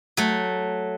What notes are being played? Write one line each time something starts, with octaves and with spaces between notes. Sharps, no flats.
F#3 A3